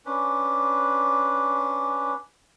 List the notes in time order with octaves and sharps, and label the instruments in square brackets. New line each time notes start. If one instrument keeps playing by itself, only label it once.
[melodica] C#4 D4 B4